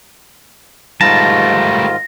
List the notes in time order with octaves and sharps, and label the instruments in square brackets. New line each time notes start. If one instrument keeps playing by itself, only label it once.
[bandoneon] G#2 D#3 F4 [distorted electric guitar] G3 A3 [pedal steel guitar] A5 [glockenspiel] A#6